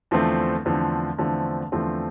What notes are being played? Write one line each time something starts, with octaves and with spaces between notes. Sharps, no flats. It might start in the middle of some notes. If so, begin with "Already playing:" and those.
E2 D3 F3 A3 C4
E2 D3 F3 A3 C4
E2 D3 F3 A3 C4
E2 D3 F3 A3 C4